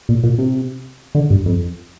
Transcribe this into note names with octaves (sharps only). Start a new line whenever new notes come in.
A#2
A#2
C3
D3
G2
F2